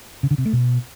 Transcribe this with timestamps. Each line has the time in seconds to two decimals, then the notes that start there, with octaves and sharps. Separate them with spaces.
0.23 C#3
0.31 D3
0.38 C3
0.46 A3
0.53 B2